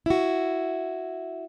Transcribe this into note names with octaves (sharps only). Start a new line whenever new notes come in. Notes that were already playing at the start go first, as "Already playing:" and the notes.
E4 F#4